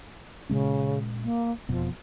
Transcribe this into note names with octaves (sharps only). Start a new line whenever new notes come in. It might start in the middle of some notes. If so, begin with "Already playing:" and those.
A#2 C#3 G#3 C#4
A#3
E1 F2 B2 F3